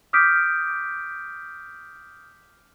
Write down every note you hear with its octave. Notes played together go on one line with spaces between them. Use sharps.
D6 D#6 F6 G6 B6 D7